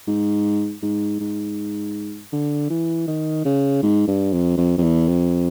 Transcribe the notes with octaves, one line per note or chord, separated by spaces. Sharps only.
G#2
G#2
G#2
D3
E3
D#3
C#3
G#2
G2
F2
F2
F2
E2
F2